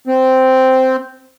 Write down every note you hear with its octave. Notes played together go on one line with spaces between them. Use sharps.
C4